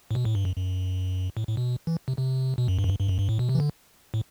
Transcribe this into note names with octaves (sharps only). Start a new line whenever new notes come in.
A2
B2
A2
G2
F#2
F#2
A2
A2
B2
E3
C3
C3
B2
F#2
G2
F#2
G2
G2
F#2
G2
A2
B2
C3
E3
D3
A2